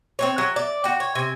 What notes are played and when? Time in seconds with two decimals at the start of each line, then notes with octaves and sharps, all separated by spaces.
0.19 C4 D#4 C#5
0.38 F#3
0.56 D5
0.84 F#4 G5
1.00 C#5
1.15 C3 G#5